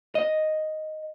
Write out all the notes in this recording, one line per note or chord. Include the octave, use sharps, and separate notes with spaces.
D#5